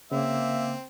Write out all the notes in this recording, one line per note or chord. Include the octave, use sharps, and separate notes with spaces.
C#3 A#3 C4 E5